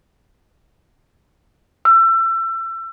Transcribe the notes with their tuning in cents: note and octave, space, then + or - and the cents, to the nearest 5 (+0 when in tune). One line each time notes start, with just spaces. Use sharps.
E6 +30